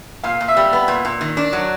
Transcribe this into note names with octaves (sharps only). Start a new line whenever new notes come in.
A#2 F5
A#2
E5
G3
B3
A#2
A#2
D#3
D4
F#3